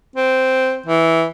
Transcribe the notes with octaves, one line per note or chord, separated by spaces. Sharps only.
C4
E3